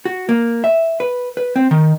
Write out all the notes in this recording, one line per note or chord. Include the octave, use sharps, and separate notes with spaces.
F#4
A#3
E5
B4
B4
C4
D#3